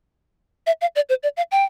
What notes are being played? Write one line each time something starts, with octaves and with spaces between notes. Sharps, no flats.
E5
F5
D5
C5
D5
F5
G5